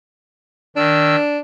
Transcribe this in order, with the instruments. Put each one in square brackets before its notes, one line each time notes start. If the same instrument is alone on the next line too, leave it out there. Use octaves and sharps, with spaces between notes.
[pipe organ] D#3 E6 [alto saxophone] D4